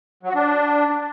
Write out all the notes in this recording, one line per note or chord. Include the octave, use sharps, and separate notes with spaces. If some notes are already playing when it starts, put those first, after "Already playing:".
F#3
F#4
D4